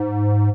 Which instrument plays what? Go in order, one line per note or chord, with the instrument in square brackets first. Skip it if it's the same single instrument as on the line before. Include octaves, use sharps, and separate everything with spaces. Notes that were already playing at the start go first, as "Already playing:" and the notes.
Already playing: [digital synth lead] G#2